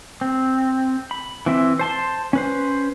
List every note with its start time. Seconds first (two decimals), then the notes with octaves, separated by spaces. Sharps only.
0.21 C4
1.11 B5
1.46 E3 C4 E5
1.79 C5 A5 C6
2.33 C#4 B4 C5